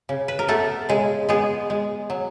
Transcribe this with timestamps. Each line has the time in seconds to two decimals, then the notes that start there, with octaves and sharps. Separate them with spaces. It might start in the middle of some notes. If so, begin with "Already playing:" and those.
0.09 C#3
0.28 B4
0.39 A#4
0.48 A3 B3 A4
0.89 C#3 G#3 G#4
1.29 G#3 B3 G#4
1.70 G#3
2.10 F#3